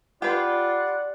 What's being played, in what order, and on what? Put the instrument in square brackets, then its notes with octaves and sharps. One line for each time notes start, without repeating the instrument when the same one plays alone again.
[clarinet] F4 [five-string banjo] G4 B4 [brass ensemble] D5 [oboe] F#5